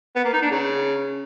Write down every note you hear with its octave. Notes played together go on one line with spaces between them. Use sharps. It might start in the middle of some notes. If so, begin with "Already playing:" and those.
B3
A#3
D#4
D4
C#3